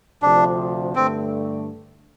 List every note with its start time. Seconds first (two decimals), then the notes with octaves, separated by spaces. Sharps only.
0.22 D2 C3 F3 D4
0.96 G2 D3 A3 C4